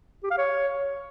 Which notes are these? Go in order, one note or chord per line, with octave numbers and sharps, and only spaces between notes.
G4
F5
C#5